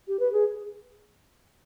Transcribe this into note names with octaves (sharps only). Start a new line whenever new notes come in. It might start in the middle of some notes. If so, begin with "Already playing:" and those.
G4
B4
G#4